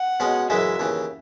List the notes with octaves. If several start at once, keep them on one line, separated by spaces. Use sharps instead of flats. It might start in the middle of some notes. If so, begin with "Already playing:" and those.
Already playing: F#5
B2 G#3 C#4
F#2 C#3 E3 G#3 E5
D#2 C#3 E3